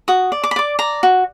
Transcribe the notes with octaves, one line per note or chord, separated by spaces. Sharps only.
F#4 D#6
D5
D6
B5
D5 D6
D5 A#5
F#4